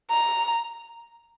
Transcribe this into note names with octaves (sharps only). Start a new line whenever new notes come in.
A#5